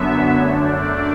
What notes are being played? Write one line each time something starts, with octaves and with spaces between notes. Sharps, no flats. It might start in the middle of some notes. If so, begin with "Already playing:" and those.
Already playing: F#2 D3 F#3 B3 E5
F#2 D3 A3 D4 C#5
D5